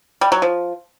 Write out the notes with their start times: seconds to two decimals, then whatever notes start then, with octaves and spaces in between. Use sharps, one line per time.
0.21 G3
0.32 F#3
0.42 F3